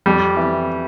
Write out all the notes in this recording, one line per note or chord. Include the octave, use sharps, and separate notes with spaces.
F2 G3
E3